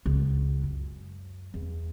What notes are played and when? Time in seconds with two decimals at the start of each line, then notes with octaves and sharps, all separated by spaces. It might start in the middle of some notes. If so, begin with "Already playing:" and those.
0.06 C#2
0.63 F#2
1.54 E2